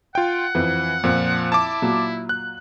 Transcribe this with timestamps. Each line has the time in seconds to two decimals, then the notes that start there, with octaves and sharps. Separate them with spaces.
0.15 F4 F#5 G5
0.55 F2 E3
1.04 F2 A#2 F3
1.52 E4 A5 D6
1.82 A#2 F#3
2.29 F#6